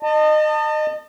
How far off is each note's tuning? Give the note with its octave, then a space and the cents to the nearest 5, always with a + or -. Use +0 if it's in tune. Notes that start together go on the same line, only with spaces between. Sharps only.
D#5 -25 A5 +30